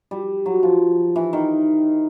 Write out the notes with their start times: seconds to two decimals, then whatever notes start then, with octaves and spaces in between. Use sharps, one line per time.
0.11 G3
0.46 F#3
0.63 F3
1.16 E3
1.33 D#3